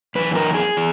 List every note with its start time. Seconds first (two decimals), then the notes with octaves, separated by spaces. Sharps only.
0.15 F#2 E3 B4
0.35 A#4
0.54 G#4
0.77 E3